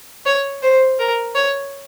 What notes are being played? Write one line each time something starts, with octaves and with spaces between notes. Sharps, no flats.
C#5
C5
A#4
C#5